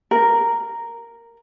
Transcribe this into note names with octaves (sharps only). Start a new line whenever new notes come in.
A#4